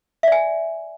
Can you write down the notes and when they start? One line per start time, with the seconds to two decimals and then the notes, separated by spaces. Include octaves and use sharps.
0.23 E5
0.28 D5
0.32 G#5